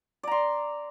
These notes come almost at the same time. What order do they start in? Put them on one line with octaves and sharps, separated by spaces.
D5 A#5 C6